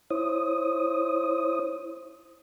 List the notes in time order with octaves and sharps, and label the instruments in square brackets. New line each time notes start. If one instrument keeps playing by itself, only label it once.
[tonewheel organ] E4 C5 C#5 D#6